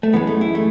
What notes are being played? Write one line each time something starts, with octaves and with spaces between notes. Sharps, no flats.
A3
F#2 E3 G#3 B3
A3
E4
A3